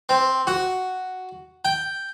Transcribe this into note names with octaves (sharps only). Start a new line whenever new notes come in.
C4
F#4
G5